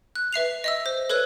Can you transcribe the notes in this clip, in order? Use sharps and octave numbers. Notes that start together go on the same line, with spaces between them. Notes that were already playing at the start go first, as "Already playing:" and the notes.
F#6
B4 E5 C7 F7
D#5 E5 E6
C5
A4 B4 C#5 F#6